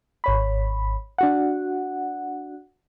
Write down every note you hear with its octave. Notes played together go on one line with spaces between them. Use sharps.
G#1 C#5 B5
D4 F#4 F#5